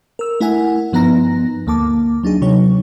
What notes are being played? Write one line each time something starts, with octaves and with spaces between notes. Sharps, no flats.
A#4 E6
A3 E4 A#4 F#5 G#5
G2 F3 B3 D#4 A#5 A#6
D2 A#3 A5 D6
F#3 D4 D#4 G#4
C3 F#3 D#4 C#5